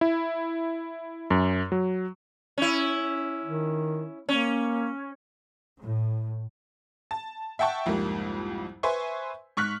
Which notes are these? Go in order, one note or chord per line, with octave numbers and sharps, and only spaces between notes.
E4
F#2
F#3
C#4 E4
D#3
A#3 C#4
A2
A5
E5 F#5 G5 A5 C#6
C2 F2 G#2 G3 A#3
B4 C5 E5 G#5 C6 C#6
G#2 C#6 F6 F#6 B6